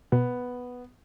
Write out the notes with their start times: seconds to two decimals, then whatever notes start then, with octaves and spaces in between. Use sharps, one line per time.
0.12 B2 B3